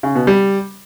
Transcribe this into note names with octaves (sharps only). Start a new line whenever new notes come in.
C#3
B2
G3